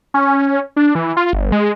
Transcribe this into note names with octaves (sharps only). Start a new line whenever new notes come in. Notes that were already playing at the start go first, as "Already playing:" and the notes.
C#4
D4
E3
F4
G1
G#3